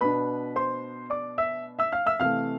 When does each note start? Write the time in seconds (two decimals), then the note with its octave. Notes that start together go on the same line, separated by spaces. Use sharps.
0.01 B2 B3 D4 B4 B5
0.56 C5 C6
1.10 D5 D6
1.38 E5 E6
1.79 E5 E6
1.92 F5 F6
2.06 E5 E6
2.20 C3 E3 A3 F5 F6